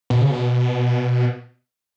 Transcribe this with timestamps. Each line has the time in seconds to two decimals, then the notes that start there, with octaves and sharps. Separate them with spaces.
0.10 B2
0.21 C#3
0.31 B2